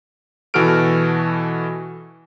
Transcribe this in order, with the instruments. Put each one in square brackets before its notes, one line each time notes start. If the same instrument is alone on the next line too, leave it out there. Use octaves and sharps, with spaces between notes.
[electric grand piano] B2 E3 F#4 A4 F6 D7